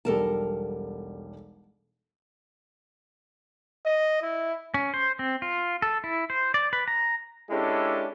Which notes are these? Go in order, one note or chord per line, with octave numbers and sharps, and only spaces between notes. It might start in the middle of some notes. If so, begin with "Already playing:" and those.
E1 B1 G3 A4 A#4 A5
D#5
E4
C#4
C5
C4
F4
A4
E4
C5
D5
B4
A#5
G#3 C#4 D4 E4 G4 A4